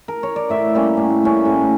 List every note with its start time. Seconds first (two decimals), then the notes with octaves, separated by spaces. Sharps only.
0.08 A#4
0.23 C#5
0.36 D5
0.50 A2 E5
0.74 G3 A#3 C#4
0.97 A2
1.22 G3 A#3 C#4
1.45 A2